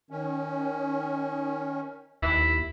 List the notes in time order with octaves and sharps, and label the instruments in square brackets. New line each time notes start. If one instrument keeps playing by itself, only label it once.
[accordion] D#3 C#4
[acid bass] D#2 [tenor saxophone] E4